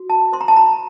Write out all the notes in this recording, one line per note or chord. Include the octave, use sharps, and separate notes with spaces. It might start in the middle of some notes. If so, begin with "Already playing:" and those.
Already playing: F#4
A5
C5 C6
A#5
A5
A#5